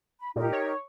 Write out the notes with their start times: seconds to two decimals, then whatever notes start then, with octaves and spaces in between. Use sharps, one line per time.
0.20 B5
0.36 A#2 D#4 G4 A#4
0.53 C#5